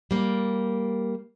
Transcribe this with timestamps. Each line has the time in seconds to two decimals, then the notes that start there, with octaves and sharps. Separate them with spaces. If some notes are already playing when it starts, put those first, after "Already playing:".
0.11 G3 A#3